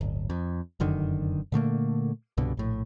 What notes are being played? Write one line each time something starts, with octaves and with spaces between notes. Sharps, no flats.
D1 G1
F2
F1 F#2 D3 D#3
A#2 D3 A3 A#3
C2 G2 B2 D3
A#1 A2